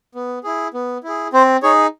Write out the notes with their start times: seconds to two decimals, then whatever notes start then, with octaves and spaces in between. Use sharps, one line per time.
0.15 B3
0.44 E4 G#4
0.74 B3
1.04 E4 G#4
1.33 C4 C5
1.63 D#4 G#4 C#5